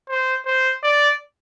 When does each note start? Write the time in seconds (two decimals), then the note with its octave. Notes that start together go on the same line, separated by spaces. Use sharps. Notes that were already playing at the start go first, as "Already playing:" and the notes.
0.09 C5
0.46 C5
0.83 D5